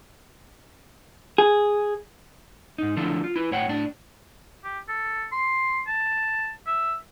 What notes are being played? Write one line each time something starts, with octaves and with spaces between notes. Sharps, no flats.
G#4
G#2 D#4
D3 F3 A3 D4 E4
F4
E4 B4
A2 C#5 F#5 G5
A2 D4
G4
A4
C6
A5
E5